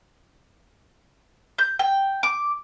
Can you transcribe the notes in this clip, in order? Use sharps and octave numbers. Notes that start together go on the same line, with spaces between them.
G6
G5
D6